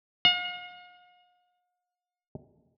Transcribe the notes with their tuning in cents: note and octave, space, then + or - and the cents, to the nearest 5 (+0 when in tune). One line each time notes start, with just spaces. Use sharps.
F5 +45